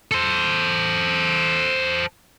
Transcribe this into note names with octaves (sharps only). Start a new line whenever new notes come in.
A4 C5